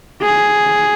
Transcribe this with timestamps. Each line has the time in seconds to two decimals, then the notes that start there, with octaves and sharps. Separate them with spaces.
0.22 G#4